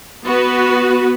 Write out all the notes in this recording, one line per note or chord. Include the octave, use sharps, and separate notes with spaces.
B3 F#4 B4